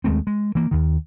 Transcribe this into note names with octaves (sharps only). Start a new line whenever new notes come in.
D#2 G#3 A3 C4
G#3
E3 A#3
D#2 D#3